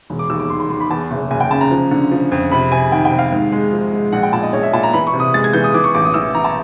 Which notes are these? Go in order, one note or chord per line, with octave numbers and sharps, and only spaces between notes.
E1
D6
D#2 E6
D6
D#3 C6
C6
D#3 C6
B5
E2 A5
F#1
F#1 G#5
G5
C#3 A5
A#5
F3
D3
F3
F2
C3 B5
C3 G#5
D#3 G5
G5
C3
F5
G#2
G#3
F3
G#3
A#1 F#5
G5
A#2 A5
D#5
A#1 C#5
E5
A#2 A5
A#5
E3 B5
C#6
C3
D#6
G#3 A6
G#6
E3 G6
D#6
E3 D6
C#6
A1 D6
D#6
E3 E6
E3 A#5
A5